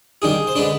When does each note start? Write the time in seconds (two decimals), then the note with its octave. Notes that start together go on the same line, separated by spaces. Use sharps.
0.22 D#3 G3 D4 G#4
0.47 C5
0.55 D3 G#3 D4 B4